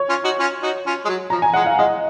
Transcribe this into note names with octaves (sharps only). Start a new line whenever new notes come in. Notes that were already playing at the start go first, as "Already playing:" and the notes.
Already playing: C#5
C#4 F4
D#4 F#4
C#4 F4
D#4 F#4
C#4 F4
G#3
F#3
F3 A#5
G#5
G#3 F#5
F5
G#3 D#5